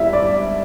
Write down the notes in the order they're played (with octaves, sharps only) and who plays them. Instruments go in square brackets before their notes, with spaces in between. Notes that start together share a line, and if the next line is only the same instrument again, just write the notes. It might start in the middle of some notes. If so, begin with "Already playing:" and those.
Already playing: [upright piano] G2 G3 E4 E5
D5